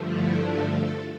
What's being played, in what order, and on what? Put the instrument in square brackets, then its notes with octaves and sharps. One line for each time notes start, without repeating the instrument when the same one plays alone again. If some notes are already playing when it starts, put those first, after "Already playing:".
Already playing: [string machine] G2 D3 F3 A3
E4
D4
A4